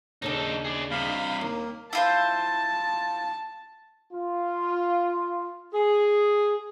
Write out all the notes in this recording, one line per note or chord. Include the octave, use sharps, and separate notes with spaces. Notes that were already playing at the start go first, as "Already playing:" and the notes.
D#2 C#3 D4 D#4 A4
G#4 D5
G2 C3 F5 B5
D#2 A#3
E4 F4 C5 A5
F4
G#4